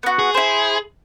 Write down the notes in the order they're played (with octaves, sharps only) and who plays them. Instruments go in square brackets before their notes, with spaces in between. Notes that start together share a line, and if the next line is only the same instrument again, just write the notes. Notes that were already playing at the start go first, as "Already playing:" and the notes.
[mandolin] B3 F#4
[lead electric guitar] G#4
[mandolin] E4 C5